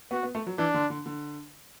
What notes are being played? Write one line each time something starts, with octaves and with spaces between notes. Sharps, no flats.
B3 F#4
B3
A3
F#3
E3 D4
D3
D3
D3